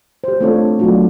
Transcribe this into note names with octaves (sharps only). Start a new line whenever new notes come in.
G4 C5
A3 C4 D4 F4 A4 C#5
F#3 A3 B3 D4 F4 F#4